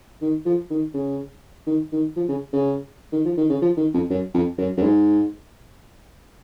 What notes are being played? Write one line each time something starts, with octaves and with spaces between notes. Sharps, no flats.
D#3
F3
D#3
C#3
D#3
D#3
F3
C#3
C#3
D#3
F3
D#3
C#3
F3
D#3
F2
F#2
F2
F#2
F#2
G#2